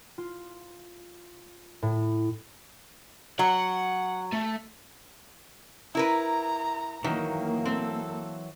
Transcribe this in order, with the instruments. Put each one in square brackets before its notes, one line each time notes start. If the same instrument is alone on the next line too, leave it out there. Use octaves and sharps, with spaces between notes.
[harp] F4
A2
[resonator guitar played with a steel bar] F#3 [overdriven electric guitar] F#5
[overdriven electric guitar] A3
[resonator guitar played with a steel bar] E4 A#4 B4 [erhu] A#5
[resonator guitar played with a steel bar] D#3 [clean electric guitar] E3 F#3 [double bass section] A#3
[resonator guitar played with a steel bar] C4 [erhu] A4